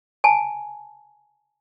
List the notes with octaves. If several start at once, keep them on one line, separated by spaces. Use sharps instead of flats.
G#5 A5